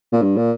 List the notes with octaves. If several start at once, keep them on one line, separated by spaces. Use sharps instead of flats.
A#2
G2
A#2